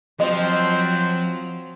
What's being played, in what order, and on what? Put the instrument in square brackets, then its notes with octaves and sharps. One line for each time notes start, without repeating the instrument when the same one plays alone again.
[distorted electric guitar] F3 [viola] F#3 C4 [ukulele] D#5